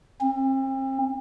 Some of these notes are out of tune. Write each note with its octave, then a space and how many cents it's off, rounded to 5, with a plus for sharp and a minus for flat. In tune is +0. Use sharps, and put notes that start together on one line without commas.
C4 +40